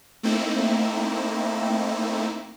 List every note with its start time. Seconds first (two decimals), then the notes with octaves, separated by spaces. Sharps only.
0.23 A3 A#3 C4 D#4 E4